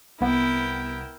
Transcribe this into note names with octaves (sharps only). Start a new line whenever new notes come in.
C2 B3 E4 A#4 G5